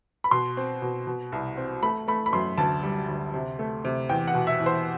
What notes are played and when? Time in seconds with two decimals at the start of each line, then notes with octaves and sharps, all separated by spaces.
0.24 B5
0.31 B2 C6
0.57 C4
0.82 B2
1.07 B2
1.32 C2
1.57 C4
1.83 A3 B5
2.08 A3 B5
2.26 B5
2.33 F#2 C6
2.58 D2 A5
2.83 G3
3.08 D2
3.34 C3
3.59 A3
3.85 C3
4.09 E2 G5
4.27 F#5
4.34 B2
4.47 E5
4.60 E2
4.66 C5